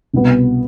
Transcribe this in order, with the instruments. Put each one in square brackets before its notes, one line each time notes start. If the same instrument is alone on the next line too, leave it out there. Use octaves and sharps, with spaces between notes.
[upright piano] C2 B2 B3